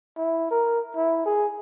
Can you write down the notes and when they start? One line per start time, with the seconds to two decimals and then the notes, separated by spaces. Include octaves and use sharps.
0.17 E4
0.51 A#4
0.96 E4
1.26 G#4